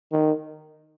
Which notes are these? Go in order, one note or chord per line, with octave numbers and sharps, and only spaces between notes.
D#3